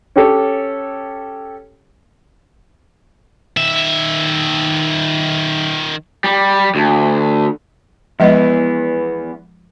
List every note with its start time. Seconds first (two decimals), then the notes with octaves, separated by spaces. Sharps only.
0.16 C#4 G4 A4 C#5
3.57 D#3 E5
6.24 G3
6.75 D2
8.20 E2 F3 G#3 B3 D#5